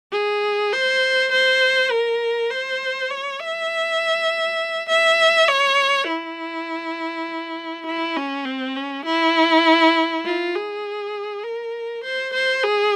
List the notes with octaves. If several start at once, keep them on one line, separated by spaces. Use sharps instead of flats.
G#4
C5
C5
A#4
C5
C#5
E5
E5
C#5
E4
E4
C#4
C4
C#4
E4
F4
G#4
A#4
C5
C5
G#4